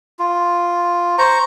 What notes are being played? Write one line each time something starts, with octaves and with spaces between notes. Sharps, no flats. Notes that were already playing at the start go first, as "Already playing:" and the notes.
F4
C5 A#5 C#6